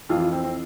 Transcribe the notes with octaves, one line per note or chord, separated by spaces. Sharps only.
F2 E3 F4
F4
C4
C4